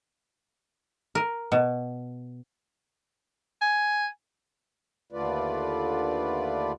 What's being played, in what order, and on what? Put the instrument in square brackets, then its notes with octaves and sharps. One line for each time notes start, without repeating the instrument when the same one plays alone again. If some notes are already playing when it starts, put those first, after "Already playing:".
[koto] A#4
B2
[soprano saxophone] G#5
[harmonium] D#2 D3 A3 F4 B4 D5